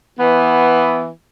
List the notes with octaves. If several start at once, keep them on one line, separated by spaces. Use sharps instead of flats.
E3 B3